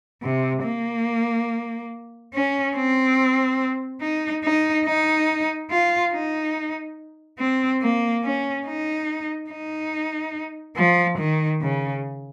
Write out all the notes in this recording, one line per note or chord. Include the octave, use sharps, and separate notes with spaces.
C3
A#3
C#4
C4
D#4
D#4
D#4
F4
D#4
C4
A#3
C#4
D#4
D#4
F3
D#3
C#3